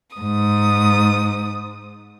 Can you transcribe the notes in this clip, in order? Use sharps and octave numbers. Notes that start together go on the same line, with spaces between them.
G#2 D#6